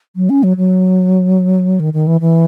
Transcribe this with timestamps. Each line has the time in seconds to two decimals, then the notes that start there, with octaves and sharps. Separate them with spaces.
0.16 F#3
0.30 C#4
0.43 F#3
0.57 F#3
1.80 D#3
1.93 D#3
2.07 E3
2.21 E3